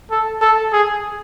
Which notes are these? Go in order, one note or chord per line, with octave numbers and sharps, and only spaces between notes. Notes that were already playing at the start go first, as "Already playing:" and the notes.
A4
A4
G#4